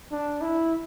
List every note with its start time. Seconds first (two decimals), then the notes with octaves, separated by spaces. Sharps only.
0.12 D4
0.41 E4